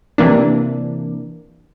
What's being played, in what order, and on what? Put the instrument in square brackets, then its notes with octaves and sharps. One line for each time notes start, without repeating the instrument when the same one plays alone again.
[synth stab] C3 E3 A#3 D4